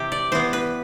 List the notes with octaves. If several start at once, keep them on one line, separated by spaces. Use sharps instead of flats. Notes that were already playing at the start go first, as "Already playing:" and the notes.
Already playing: C3 E3 G4
D5
E3 B3 C5
B4